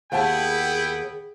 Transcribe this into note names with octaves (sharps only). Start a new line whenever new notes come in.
D#2 B3 E4 G#4 F#5 G5 A5